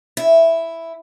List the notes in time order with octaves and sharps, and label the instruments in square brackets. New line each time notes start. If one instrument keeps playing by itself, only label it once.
[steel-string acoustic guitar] E4